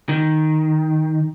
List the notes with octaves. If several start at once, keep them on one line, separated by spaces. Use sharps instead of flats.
D#3